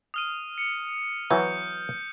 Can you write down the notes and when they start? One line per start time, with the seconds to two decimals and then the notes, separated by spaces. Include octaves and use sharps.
0.14 D#6 F6 D#7
0.58 C#7
1.30 E3 F#3 B3 G6